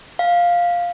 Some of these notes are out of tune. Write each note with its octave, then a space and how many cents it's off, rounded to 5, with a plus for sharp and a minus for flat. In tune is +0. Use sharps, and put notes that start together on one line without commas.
F5 +5